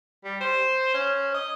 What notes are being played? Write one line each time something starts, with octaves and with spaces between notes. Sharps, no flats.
G3
C5
C#4
D#5